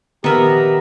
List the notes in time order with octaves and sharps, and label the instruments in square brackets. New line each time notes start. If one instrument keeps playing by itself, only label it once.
[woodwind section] A#2 F3 A#5 [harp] D#3 A#4 [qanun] B3 E5 [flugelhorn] G4